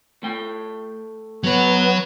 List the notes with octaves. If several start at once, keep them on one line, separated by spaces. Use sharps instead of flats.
A3 G5
F#3 B3 C#5